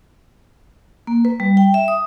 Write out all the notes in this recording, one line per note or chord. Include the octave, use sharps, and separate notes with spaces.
A#3
B4
G3
G5
E5
D#6